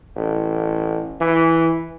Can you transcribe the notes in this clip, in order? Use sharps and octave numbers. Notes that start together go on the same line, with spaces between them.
A1
E3